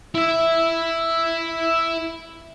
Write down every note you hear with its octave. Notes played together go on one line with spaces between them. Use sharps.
E4 E5